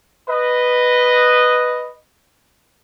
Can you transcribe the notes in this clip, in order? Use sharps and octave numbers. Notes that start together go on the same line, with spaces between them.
B4 D#5